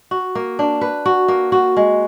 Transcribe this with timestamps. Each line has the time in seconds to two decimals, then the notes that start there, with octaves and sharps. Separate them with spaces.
0.11 F#4
0.35 A#3
0.59 D4
0.81 B4
1.06 F#4
1.28 A#3
1.52 F#4
1.77 G#3